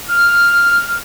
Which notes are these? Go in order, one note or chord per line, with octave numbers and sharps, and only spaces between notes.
F6